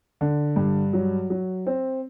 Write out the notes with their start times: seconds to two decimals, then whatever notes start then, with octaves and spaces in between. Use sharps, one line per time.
0.21 D3
0.56 G2
0.93 F#3
1.30 F#3
1.67 C4